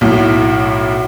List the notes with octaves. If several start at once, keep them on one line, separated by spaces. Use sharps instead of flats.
B1 A2